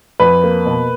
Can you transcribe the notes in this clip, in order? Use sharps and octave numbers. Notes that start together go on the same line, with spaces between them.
F2 B4
A#3
B2